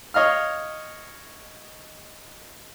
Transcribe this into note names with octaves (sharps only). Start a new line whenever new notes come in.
C#5 D#5 F5 F6